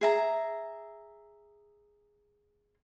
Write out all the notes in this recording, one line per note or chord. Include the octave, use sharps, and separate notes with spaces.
G#4 E5 A#5